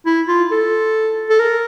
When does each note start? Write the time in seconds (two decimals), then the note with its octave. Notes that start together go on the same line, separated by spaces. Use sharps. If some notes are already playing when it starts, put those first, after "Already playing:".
0.06 E4
0.28 F4
0.51 A4
1.30 A4
1.39 A#4